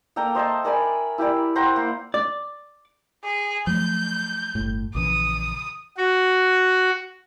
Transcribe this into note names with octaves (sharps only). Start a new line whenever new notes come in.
A#3 A4 G5 A#5
C5 D#5 E5 A5
A#4 D5 G#5 B5
E4 G4 A#4 D5
C5 F#5 G5 A#5
A#3
D5
G#4
F3 F#3 A3 G6
G1 A2
A#1 C#3 E3 D#6
F#4